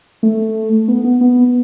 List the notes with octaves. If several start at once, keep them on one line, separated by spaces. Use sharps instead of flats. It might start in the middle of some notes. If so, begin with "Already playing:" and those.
A3
B3
B3
B3